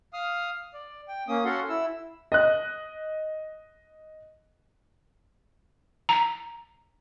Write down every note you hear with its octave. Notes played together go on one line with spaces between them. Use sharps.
F5 D#6 F6
D5
G5
A#3 C#4 D#6
C#4 F#4 A4 F5 F#5 C6
E4 E6
D#5 F#6
A#5